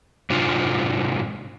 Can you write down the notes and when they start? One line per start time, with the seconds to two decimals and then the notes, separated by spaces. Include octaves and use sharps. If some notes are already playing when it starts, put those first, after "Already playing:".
0.30 G#2 C3 D4 F4